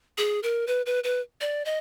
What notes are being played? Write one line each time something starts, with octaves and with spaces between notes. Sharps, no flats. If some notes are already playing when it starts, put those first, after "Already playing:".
G#4
A#4
B4
B4
B4
D5
D#5